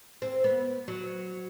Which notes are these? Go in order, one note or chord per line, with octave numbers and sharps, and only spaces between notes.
C4
B3
F#3